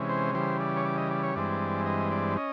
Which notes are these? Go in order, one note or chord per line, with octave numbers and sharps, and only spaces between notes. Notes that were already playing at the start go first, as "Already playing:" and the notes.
Already playing: C3 E3 G#3 C#4
C5
C#3 E3 G3 C5
D5
C#5
D5
D#5
D5
C#5
G2 E3 G#3 C4 D5
D#5
D5
C#4 D#5